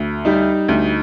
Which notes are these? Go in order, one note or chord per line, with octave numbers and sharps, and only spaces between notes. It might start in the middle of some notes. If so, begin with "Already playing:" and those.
Already playing: D2
G3 D#4
D2